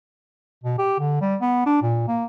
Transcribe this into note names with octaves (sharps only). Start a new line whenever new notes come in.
B2
G4
D3
G3
B3
D4
A#2
A#3